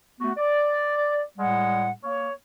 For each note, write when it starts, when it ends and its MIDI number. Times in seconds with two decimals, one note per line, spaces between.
0.21 0.31 57
0.21 0.31 59
0.21 0.31 66
0.37 1.21 74
1.39 1.90 45
1.39 1.90 55
1.39 1.90 56
1.39 1.90 78
2.04 2.32 58
2.04 2.32 73